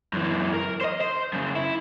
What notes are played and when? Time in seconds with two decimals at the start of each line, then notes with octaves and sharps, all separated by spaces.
0.13 F#2 E3
0.53 A#4
0.81 C5 D#5
1.01 C5
1.33 F#2 C#3
1.56 E4